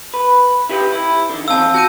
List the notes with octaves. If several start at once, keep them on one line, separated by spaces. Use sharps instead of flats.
B4
E4 G4 B4
E4
D3 D#3
E2 C4 F5 A5 E6
F#4 A5 G6 D#7